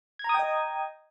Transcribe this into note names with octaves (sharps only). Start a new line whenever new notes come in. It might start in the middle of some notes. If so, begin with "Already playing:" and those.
D#5 G5 A#5 D#6 G#6